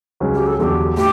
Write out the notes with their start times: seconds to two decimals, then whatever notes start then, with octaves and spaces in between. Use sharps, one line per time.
0.20 C#2 C#3 F#3 C#4
0.34 G4
0.47 A4
0.59 E2 D3 F#3 G4 A4
0.97 A2 G4